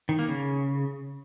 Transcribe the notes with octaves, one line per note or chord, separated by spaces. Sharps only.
D#3
A#3
C#3